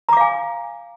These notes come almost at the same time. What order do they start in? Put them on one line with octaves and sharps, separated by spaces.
A#5 D6 F5 G#5